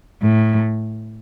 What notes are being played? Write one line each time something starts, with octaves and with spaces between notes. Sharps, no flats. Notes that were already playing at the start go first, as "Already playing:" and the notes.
A2